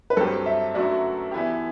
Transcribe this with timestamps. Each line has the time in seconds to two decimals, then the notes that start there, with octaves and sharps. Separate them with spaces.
0.10 B4
0.17 G2 F#3 C4 G4 A4
0.46 E5
0.74 F#2 F#3 A3 D4 F#4
1.31 E3 B3 E4 G4